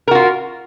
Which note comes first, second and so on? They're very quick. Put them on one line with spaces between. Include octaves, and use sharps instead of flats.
A#4 F#4 F4